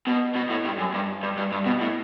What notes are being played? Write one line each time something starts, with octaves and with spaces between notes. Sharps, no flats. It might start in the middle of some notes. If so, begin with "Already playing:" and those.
B2
B2
A2
G2
F#2
G2
G2
G2
G2
B2
A2